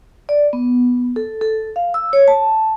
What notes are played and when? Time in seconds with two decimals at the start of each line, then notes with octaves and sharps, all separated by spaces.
0.29 D5
0.53 B3
1.16 A4
1.41 A4
1.76 F5
1.94 E6
2.13 C#5
2.28 A5